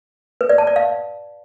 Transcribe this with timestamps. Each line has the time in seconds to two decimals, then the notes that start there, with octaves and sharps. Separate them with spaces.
0.41 B4
0.49 D5
0.58 A5
0.67 D5
0.76 F5